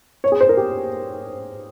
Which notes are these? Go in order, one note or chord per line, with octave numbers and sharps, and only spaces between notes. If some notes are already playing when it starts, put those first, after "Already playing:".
C#5
G#4
C5
A#4
G4